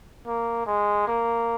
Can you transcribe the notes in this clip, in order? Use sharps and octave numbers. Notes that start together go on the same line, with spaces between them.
A#3
G#3
A#3